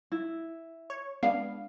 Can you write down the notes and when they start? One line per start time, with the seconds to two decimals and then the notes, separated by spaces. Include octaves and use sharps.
0.12 E4
0.90 C#5
1.23 G#3 B3 D4 F5